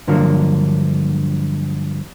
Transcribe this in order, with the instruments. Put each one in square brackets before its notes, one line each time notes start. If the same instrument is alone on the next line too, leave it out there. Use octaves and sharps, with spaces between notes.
[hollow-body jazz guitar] G2 D3 F3 F#3 A#3